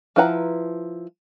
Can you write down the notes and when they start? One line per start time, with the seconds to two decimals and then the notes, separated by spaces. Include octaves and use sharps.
0.16 F3 E4 B4 F#5 A#5